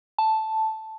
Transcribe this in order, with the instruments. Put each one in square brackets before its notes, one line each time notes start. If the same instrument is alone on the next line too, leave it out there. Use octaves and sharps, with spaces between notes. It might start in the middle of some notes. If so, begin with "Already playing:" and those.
[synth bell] A5